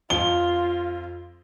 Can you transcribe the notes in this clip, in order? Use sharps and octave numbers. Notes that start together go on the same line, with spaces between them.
F2 F4 G7